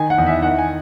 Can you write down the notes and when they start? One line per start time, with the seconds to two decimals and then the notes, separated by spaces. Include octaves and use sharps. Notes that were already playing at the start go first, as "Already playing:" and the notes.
Already playing: D#3 G#5
0.10 F#5
0.18 E2
0.27 E5
0.42 D#3 F#5
0.58 G#5